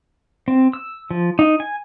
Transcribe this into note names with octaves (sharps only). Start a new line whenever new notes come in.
C4
E6
F3
D#4
G#5